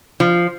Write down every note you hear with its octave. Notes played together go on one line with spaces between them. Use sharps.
F3